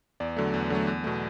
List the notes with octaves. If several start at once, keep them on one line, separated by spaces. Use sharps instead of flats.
E2 D5
D3 F#3 A3
E2
D3 F#3 A3
E2
B2 A3